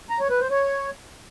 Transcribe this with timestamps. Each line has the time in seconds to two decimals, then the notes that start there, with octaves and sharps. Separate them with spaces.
0.10 A#5
0.20 C#5
0.30 B4
0.40 C5
0.50 C#5